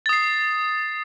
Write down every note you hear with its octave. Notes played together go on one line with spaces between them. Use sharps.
D#6 A6 C7